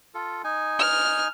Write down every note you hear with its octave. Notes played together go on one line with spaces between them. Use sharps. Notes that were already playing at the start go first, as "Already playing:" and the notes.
F4 A4
D#4 G#5
F6